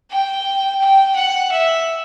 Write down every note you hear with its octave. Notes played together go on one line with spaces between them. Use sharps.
G5
G5
F#5
E5